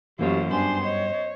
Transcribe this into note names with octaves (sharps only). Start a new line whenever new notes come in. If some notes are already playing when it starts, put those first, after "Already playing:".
F#2 E3 A3 A#3 F4 G4 C5 C#5
G2 B3 D4 G4 C5 G#5 C6
C5 C#5 D#5